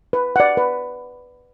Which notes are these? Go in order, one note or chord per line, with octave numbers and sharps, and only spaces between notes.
B4
D5 F#5
B4